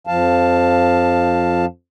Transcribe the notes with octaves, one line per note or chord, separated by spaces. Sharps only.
F2 F3 F5 A5